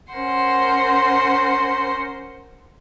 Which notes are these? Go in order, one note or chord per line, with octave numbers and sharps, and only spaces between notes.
C#4 A#4 C5 F#5 C6